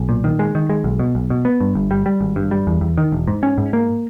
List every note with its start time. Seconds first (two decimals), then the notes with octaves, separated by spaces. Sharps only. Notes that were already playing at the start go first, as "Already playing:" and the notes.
Already playing: B1
0.09 A#2
0.24 D#3
0.39 G#3
0.55 D#3
0.70 G#3
0.84 B1
0.99 B2
1.15 B1
1.30 B2
1.45 B3
1.60 G2
1.75 G1
1.91 G3
2.06 G3
2.21 G#1
2.36 G2
2.51 G3
2.67 E2
2.81 E2
2.98 D#3
3.12 E1
3.28 G#2
3.43 C#4
3.58 G#2
3.73 A#3